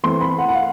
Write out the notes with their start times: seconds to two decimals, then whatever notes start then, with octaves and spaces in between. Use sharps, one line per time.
0.03 E3 A3 C4 C6
0.21 B5
0.39 F#5
0.49 F#5
0.55 F5